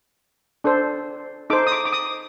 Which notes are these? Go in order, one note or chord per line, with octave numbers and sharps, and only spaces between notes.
D4 A4 C5
D#4 A4 C5 D6
D#6
D6
D6
D#6